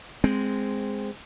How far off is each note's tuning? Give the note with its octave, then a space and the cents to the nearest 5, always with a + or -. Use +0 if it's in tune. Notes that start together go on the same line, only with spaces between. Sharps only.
G#3 +0 C4 -5